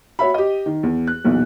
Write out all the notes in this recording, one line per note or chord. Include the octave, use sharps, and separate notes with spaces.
F#4 C#5 E5 B5
G4 D#5
D#3
E2
F#6
B1 E2 A#2